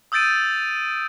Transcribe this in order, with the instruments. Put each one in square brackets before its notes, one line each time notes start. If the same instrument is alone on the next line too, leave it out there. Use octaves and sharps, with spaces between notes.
[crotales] D#6 E6 G6 A6 D7 D#7